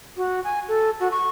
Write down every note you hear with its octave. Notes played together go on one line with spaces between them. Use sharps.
F#4
G#5
A4
F#4
C#6